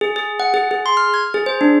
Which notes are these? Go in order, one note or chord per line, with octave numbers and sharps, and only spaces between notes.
G#4
G#4
F#5
G#4
G#4
C6
F6
G#6
G#4
C5
D4